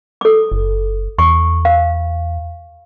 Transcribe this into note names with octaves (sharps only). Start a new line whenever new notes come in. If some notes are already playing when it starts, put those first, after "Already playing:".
A4 D6
F#1
E2 C#6
F5